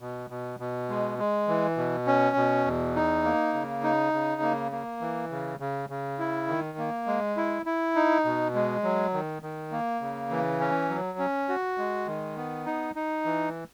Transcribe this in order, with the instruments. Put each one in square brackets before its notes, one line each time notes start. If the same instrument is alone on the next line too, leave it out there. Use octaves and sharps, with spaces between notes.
[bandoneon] B2
B2
B2
G#3
G#3
E3
B2
C#4
B2
E2
D#4
A#3
C#3
D#4
C#3
A#3
A#3
E3
C#3
C#3
C#3
E4
D#3
A#3
G#3
E4
E4
D#4
B2
G#3
F#3
D#3
D#3
A#3
C#3
E3
C#4
F#3
C#4
F#4
G#3
D#3
B3
D#4
D#4
E3